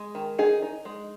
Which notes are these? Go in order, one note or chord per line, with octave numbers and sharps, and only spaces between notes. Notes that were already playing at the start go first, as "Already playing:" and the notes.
Already playing: G#3
D#3
D#4 G#4
D#4
G#3